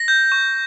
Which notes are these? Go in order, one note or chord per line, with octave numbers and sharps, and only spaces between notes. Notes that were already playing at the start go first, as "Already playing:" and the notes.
Already playing: A#6
G6
C#6